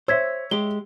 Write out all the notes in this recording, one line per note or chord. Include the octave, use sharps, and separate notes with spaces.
C5 C#5 E5 E6 G#6 B6
G#3 G4 G7